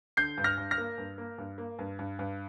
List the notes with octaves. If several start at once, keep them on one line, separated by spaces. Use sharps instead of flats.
D3 G6 C7
G2
F6 A#6
G2
F6 A#6
A#3
G2
A#3
G2
A#3
G2
G2
G2